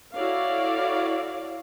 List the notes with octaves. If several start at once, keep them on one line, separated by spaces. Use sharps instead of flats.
E4 F#4 A4 C#5 D5 F5